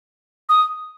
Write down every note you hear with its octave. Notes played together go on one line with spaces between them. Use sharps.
D#6